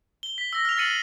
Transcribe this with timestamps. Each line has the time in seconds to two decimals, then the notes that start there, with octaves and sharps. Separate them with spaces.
0.23 G7
0.38 B6
0.53 E6 A#6
0.65 F6 F7
0.77 F6 A6 C7 C#7 D#7 F#7